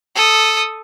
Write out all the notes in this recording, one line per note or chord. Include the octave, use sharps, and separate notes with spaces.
A4 D#6